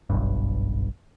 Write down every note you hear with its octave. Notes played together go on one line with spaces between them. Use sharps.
F#1 B1 G2